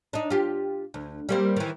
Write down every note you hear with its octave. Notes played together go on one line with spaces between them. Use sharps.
D4 D#4
F4 G4
D2
G3 A#3 C4
D#3 E3